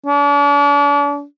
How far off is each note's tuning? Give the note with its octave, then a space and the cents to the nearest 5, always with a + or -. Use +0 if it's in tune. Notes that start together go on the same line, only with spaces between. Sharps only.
D4 -40